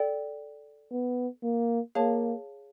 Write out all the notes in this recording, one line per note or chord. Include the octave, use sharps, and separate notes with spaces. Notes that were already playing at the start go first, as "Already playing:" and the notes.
Already playing: A4 D5 G5
B3
A#3
A#3 G#4 C#5 F5 A5